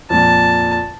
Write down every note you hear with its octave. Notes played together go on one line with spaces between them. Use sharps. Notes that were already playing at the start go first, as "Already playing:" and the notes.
F2 A#2 A5